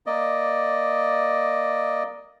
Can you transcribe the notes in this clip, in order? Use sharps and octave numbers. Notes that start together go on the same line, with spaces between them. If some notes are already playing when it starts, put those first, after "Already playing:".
A#3 D5 D#5